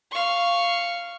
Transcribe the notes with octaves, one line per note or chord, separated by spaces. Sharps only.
F5 C#6